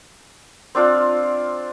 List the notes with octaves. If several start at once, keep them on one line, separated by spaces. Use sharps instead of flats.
C4 D4 F4 D5